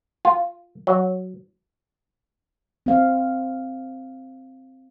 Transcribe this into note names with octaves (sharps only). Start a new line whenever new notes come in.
F4
F#3
C4 F5